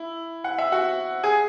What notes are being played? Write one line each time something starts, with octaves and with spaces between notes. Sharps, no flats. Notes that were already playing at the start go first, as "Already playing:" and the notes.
Already playing: E4
F#5
E5
F#4 F#5
G#4 G#5